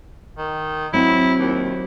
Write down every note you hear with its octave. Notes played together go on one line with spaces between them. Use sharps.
D#3
F#3 C4 E4
D#2